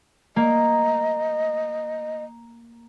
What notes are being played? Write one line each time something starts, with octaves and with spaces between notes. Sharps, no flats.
A#3 D#5